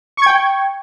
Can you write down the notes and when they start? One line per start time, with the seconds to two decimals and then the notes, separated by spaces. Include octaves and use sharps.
0.17 C#6
0.22 G#6
0.26 G5